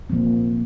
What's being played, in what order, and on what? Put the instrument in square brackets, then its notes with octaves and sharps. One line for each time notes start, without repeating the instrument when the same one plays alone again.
[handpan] A#2 F3 A#3 C4